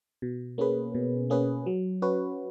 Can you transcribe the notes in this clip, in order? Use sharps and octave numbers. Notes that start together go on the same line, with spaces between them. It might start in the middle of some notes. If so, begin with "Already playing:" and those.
B2
A#3 C#4 G#4 B4
B2
A#3 C#4 G#4 B4
F#3
C#4 F#4 B4